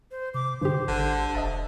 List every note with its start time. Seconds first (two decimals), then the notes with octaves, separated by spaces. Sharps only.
0.11 C5
0.34 C3 D6
0.61 G2 D3 G4 C5
0.88 G#1 D3
1.35 E1 D#5 E5 A5